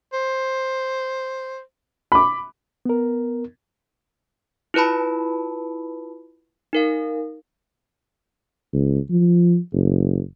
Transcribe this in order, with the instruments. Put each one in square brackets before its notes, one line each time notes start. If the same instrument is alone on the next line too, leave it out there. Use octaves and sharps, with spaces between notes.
[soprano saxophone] C5
[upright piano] B5 D6
[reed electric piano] B3 A#4
[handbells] E4 F4 B4 A5 B5
D#4 A#4 F5
[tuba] C#2
F3
F#1